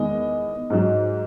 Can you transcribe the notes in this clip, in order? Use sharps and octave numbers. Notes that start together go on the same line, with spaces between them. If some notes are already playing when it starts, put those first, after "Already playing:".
Already playing: E2 D#3 G#3 D#5
G#2 F#3